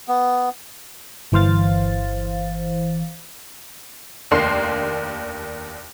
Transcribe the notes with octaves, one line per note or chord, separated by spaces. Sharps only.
B3
G1 E3 C5 F5 A6
F1 D#2 A#3 D4 C6 C7